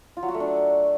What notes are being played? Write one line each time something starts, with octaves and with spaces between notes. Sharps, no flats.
F4
F#3
F#4
A3
D4